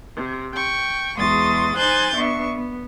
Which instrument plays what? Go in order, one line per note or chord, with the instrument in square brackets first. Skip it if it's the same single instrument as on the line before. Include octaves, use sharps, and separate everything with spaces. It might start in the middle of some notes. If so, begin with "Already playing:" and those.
[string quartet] C3
G5 C#6
E2 G#3 F#4 C6 D#6 A6
D#4 C5 G#5 F#6 G6 A6
B3 D4 E5 C#6
B3